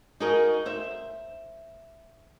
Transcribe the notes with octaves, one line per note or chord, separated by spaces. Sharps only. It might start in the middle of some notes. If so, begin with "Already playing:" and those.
D#4 F#4 G#4 A#4 D#5
C5 E5